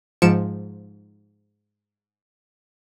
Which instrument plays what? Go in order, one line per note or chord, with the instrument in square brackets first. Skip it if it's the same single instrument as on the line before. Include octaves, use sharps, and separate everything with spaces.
[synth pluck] G#2 F3 C#7 D7 E7